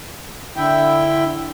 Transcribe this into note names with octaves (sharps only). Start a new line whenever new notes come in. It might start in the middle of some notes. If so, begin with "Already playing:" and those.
D3 E4 E5 G5